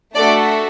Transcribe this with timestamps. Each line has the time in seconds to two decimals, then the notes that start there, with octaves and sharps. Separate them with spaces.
0.15 A3 D4 F#4 A4 D5